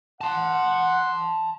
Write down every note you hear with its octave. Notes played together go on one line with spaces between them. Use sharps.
F#5 A5 C6